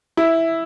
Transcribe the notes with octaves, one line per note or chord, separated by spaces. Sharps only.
E4